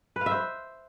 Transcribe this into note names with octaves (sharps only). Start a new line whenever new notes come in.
B4
F5
E5
C5